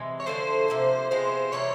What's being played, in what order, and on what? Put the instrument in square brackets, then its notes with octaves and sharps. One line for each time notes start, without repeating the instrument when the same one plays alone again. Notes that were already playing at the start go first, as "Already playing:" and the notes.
Already playing: [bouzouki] C3 E3 G#3
[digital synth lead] C#5
[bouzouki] D3 F3 A3 [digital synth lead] C5
[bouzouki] C3 F3 A#3
[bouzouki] C3 F3 G#3 B3 [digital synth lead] C5
[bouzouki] C3 E3 G3 A#3 [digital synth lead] C#5